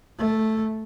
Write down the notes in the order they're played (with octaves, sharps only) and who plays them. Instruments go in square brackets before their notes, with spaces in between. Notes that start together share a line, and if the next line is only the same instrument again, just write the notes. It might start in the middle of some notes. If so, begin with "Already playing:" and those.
[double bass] A3